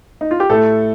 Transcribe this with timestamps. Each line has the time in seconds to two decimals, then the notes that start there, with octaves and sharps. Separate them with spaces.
0.21 D#4
0.31 F4
0.40 G4
0.50 A2 A3 A4